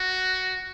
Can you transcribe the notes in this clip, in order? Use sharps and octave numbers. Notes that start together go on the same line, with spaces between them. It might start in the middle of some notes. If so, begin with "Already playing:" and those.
Already playing: F#4